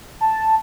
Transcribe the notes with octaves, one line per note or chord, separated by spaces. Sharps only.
A5